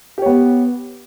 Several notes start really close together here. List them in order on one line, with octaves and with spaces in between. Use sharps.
G4 C#5 B3